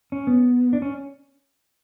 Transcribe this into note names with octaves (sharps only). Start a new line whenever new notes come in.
C#4
B3
D4
C#4